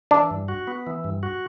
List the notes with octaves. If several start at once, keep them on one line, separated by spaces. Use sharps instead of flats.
E3 D4
G2
F#4
B3
E3
G2
F#4